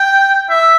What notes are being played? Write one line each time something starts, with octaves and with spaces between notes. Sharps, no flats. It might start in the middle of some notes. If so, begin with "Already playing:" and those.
Already playing: G5
E5